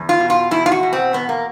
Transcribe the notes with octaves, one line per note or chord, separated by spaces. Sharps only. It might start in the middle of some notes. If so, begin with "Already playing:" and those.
Already playing: E2
F4
B2
F4
E2 E4
F4
F#4
B2
C4
E2 B3
A#3